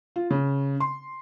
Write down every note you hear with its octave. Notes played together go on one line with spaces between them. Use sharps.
F4
C#3
C6